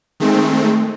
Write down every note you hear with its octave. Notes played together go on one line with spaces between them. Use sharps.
D#3 G#3 A3 C4